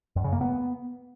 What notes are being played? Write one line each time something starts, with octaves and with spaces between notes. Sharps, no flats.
F#2
C#3
A#3
B3